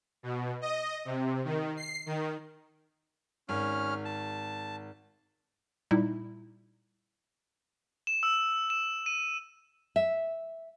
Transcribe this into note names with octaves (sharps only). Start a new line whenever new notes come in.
B2
D#5
C3
D#3
C7
D#3
G#1 C#4 F6
A5
A#2 G3 D#4 E4
E7
E6
E7
D#7
E5